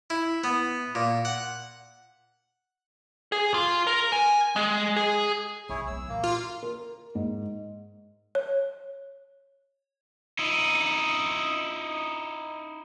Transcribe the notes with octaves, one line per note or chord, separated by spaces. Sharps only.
E4
B3
A#2
F#5
G#4
F4
A#4
G#5
G#3
G#4
B1 E4 G#4 C#5
F#3 B3 E6
A#2 E3 A#3
F4
A#4
G#2
C#5
D#4 E4